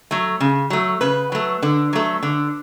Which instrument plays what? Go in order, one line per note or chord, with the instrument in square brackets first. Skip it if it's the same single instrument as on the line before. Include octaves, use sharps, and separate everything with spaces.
[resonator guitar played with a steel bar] F#3 A3
C#3
F#3 A3
C#3 B4
F#3 A3
D3
F#3 A3
D3